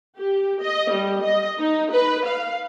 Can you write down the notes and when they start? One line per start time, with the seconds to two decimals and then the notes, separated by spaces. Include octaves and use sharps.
0.18 G4
0.62 D#5
0.92 G3
1.23 D#5
1.60 D#4
1.92 B4
2.27 F5